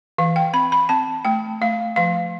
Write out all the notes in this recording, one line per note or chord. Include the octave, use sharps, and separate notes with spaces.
E3 F5
G5
C4 B5
B5
C4 A5
A3 G5
A3 F5
F3 F5